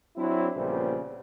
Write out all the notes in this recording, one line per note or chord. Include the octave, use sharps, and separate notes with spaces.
F#3 C4 D4 E4
A#1 A#2 C#3 G3 B3 C5